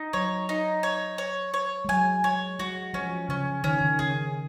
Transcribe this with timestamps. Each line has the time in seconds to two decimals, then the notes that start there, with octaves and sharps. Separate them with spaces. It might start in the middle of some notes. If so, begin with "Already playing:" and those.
Already playing: D#4
0.13 F#3 C#5
0.49 D#4
0.83 C#5
1.18 C#5
1.54 C#5
1.85 G#3
1.89 F#3 G#5
2.24 G#3 C#5
2.59 G#3 F#4
2.93 F3 C#4
3.29 C#3 C#4
3.64 D#3 C#4
3.72 C#3
3.80 D#3
3.99 C#3 G#4